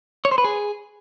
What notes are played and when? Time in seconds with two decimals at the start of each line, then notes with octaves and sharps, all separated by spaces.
0.25 C#5
0.31 C5
0.38 B4
0.44 G#4